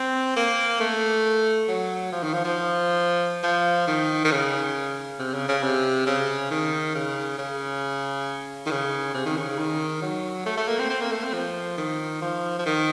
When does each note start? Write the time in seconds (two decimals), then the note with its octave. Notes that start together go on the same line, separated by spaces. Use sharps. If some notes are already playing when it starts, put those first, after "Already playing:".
Already playing: C4
0.36 A#3
0.80 A3
1.68 F#3
2.12 F3
2.23 D#3
2.34 F3
2.45 F3
3.43 F3
3.88 D#3
4.25 D#3
4.31 C#3
5.19 C3
5.34 C#3
5.49 C#3
5.63 C3
6.07 C#3
6.51 D#3
6.95 C#3
7.39 C#3
8.66 D#3
8.71 C#3
9.14 C3
9.26 D#3
9.37 C#3
9.58 D#3
10.02 F#3
10.46 A3
10.57 A3
10.68 A#3
10.79 C4
10.90 C4
11.01 A#3
11.12 A3
11.23 C4
11.33 F3
11.77 D#3
12.22 F3
12.59 F3
12.66 D#3